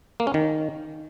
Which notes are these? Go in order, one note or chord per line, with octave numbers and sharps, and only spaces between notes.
A#3
C#4
D#3